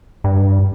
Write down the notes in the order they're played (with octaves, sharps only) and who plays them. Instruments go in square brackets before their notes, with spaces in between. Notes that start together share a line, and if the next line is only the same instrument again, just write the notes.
[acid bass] G2